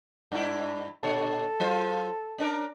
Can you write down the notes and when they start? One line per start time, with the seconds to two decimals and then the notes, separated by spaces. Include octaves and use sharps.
0.32 G2 D4 E4
1.03 A#2 D3 A4 C#5
1.60 F#3 F4 C5
2.38 C#4 D4 A#4